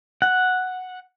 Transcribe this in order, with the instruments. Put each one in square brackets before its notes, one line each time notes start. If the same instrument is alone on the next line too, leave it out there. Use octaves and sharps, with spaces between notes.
[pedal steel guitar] F#5